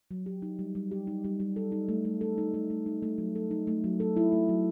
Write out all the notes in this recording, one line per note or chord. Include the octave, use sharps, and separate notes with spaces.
F#3
G4
D#4
G3
G3
G4
D#4
G3
G3
A4
D#4
A3
A3
A4
D#4
A3
A3
D#4
A3
F#3
A4
D#4
A3
F#3
A4
E4
A3
F#3